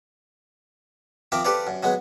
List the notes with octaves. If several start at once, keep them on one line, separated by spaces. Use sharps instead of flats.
F3 C4 A#4 E5 D6
G4 A4 B4 C5 D5 F5
F#2
F#3 G#3 B3